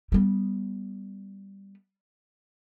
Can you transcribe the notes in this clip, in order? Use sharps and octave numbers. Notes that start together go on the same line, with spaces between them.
G3 B3